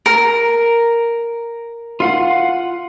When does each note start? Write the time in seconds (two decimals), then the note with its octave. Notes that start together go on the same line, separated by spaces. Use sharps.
0.06 A#4
2.00 F4 F5 F#5